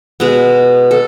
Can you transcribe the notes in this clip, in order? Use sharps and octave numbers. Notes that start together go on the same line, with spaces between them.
B2 G#3 B3
A4